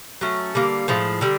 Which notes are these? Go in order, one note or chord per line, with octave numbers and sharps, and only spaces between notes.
F#3 A3 C#4
D3 G3 A#3
A2 F3 G#3
D3 G3